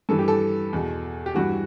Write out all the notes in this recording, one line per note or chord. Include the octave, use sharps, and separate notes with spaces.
G2 E3 A4
G4
A4
E2 B2
G4
G2 E3 F#4